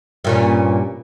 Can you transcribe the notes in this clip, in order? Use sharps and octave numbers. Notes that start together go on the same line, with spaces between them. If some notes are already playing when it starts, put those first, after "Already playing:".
G2 A#2 C#4